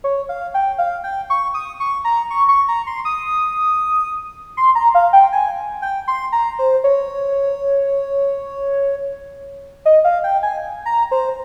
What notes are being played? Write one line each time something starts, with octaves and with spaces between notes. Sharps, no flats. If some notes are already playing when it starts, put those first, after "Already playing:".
C#5
F5
G5
F5
G5
C#6
D#6
C#6
A#5
C#6
C#6
A#5
C6
D#6
C6
A#5
F5
G5
G#5
G5
C6
A#5
C5
C#5
D#5
F5
G5
G#5
A#5
C5